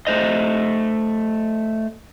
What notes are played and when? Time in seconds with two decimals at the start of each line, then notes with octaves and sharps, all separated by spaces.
0.07 A3 C5 D#5